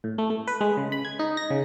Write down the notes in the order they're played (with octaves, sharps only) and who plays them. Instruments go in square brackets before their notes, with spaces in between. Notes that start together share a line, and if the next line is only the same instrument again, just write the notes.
[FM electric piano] A2
A3
A3
B4
G#3
C#3
B5
G#6
D#4
A#6
C#3